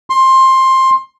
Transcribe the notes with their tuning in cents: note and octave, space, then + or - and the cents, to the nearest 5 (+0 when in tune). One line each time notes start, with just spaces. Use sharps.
C6 +15